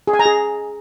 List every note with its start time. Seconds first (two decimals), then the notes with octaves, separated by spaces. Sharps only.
0.07 G#4
0.13 G#5
0.19 A#5
0.25 G#4